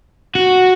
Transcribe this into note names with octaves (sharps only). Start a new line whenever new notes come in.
F#4